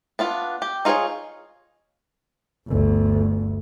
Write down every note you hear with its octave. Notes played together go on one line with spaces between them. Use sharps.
B3 D4 F4
G4
D#4 F4 G#4 C5 C#5
G1 D2